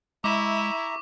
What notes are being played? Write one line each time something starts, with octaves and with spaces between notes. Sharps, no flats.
G#3 E4 E5 A#5 C#6 D6